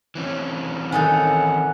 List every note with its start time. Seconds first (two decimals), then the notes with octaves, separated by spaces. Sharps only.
0.15 E3 C4 C#4
0.92 D#3 D#4 A4 F#5 G#5